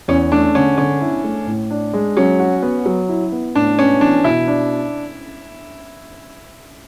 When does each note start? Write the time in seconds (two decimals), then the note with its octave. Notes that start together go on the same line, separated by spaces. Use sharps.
0.08 E2 C#4
0.32 A3 D4
0.55 D3 C#4
0.77 D3 C#4
1.01 E4
1.24 A3
1.47 A2
1.70 D4
1.94 G#3
2.17 F#3 C#4
2.40 F#4
2.62 B3
2.86 F#3
3.09 E4
3.32 B3
3.55 A2 D4
3.78 B3 C#4
4.01 E3 D4
4.24 B2 E4
4.47 D4